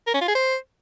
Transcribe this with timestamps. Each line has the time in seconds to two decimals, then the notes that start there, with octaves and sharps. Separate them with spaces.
0.08 A#4
0.14 C#4
0.21 F4
0.28 G#4
0.35 C5